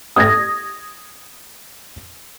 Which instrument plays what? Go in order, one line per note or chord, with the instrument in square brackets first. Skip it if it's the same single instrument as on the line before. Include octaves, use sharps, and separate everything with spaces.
[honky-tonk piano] D#6 G#6 A#6